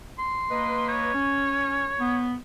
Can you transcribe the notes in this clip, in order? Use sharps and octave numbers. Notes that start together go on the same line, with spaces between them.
C6
A#3 B4 D#5
C#5
C#4
B3